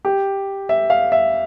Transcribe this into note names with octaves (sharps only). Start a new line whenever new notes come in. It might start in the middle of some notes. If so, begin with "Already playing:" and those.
G4
E5
F5
E5